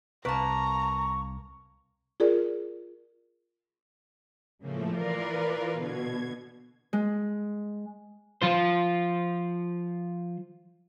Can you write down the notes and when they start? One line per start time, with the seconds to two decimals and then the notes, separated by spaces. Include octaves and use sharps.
0.25 C2 A#3 B4 A5 A#5 C#6
2.20 F4 G#4 A#4 D5
4.61 A2 C#3 F3 A3 A#3
4.95 E3 F4 A#4 B4 D5 F5
5.79 B2 D3 G#6
6.93 G#3
8.42 F3 F4 C5